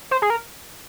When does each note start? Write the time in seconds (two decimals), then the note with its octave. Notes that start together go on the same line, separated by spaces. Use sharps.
0.11 C5
0.22 G#4
0.30 A#4